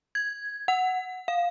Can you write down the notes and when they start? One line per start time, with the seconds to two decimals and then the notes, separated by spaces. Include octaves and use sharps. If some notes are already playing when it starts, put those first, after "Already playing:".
0.15 G#6
0.68 F#5
1.28 F5